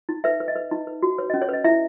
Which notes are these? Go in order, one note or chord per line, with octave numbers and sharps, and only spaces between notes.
D#4
B4 E5
B4
D#5
B4
D#4
B4
F#4
B4 C#5
D#5
C#4
C#5
B4 D#5
E4 E5